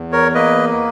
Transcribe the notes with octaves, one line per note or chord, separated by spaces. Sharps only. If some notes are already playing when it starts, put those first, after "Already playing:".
Already playing: E2
A#4 C#5
A#3 B4 D#5